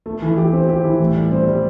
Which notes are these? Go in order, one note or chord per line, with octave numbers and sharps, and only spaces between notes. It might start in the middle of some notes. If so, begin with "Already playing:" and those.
A3
E3
G4
C4
G4
E3
A2
G3
C4
G3